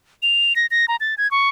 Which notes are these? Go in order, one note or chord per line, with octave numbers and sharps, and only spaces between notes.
F7
A#6
A#6
A#5
A6
G#6
C#6